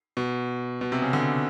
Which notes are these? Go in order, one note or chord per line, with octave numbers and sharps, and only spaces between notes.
B2
B2
C3
C#3
D3